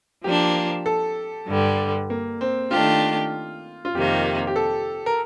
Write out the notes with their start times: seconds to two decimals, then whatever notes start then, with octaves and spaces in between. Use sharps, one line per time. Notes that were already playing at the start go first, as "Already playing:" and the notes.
0.24 F3 A#3 D4 G4
0.86 A4
1.48 G2 D3 G3
2.10 A#3
2.41 C4
2.71 D#3 A3 D4 F4 G4
3.85 F4
3.94 F2 C3 D#3 A#3 G4
4.47 G4
4.56 A4
5.06 A#4